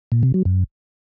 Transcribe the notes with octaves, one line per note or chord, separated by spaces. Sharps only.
A#2
C3
F#3
F#2